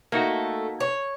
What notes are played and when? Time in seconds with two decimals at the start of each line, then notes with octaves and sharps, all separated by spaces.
0.12 A3 A#3 D#4 F#4
0.80 C#5